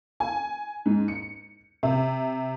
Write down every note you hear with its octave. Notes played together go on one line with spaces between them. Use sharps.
G#5
G#2
C#7
C3